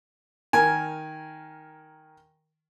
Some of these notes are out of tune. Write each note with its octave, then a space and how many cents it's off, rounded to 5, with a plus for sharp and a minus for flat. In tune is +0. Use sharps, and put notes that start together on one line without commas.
D#3 +5 A#4 +0 G#5 +0